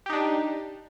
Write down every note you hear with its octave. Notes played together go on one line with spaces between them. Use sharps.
D4 D#4 G4